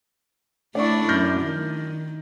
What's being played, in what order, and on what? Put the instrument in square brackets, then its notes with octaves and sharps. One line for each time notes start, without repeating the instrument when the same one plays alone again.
[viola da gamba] A3 D4 E4 [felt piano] D5 C#6
[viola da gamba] F#2 [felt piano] F6 G6 A#6
[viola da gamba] D#3